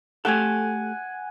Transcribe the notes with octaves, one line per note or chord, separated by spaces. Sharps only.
A3 G4 A4 F#5 G#5